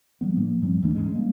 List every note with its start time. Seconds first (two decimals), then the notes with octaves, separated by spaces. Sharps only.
0.21 F3 G3 B3
0.36 A2 F3 A#3 D4
0.62 G2 F3 G3 C4
0.81 D#2 E3 A3 D4
0.94 D1 G#2 G#3 C#4
1.12 G3 G#3 A#3